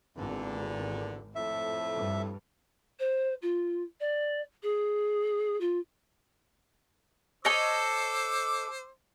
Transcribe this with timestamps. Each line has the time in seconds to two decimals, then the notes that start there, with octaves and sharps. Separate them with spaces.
0.17 G#1 E2 A#2 D3
1.35 F2 A2 E5
1.95 G2
2.99 C5
3.42 F4
4.00 D5
4.62 G#4
5.60 F4
7.45 A4 C5 C#5 D#5 D6 E6